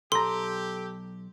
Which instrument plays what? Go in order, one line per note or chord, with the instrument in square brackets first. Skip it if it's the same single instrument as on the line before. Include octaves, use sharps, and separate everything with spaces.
[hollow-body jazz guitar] B1 A#5 [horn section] G4 [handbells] A4 [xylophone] C6